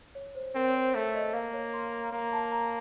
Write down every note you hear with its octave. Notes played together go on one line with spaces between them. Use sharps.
C#5
C5
C4 A#4
C#5
C5
A3 C#5
D#5
A#3 F5
C#5
C6
A#5
A#3 A#5
A5
A#5